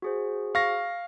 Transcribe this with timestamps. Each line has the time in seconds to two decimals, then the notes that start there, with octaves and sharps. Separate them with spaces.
0.02 F#4 G#4 C5
0.55 F5 C#6 A#6